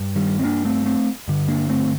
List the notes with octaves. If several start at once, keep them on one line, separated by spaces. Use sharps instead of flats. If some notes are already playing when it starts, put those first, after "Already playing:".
Already playing: G2
D#3 G3
C4
A#3 D4
A3 C4
A3 C4
G2 D3
A#3 D4
A3 C4